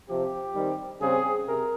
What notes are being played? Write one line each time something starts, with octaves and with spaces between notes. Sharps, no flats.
C3 F3 C4 G4
D#3 G3 C4
C#3 G3 C4 G#4
C3 A#4